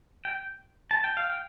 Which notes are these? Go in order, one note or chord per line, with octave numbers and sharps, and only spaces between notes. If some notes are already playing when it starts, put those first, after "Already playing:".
G5
A5
G5
F5
G5